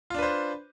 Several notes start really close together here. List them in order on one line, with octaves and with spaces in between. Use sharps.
F4 D4 B4 C5